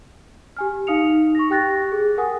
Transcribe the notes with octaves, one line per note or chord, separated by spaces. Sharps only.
G4 G#5 F6
D#4 F5 D#6 C#7 F7
C#6 A#6
G4 G5 F#6 A6 A#6
G#4
A#4 F#5 G#5 D#6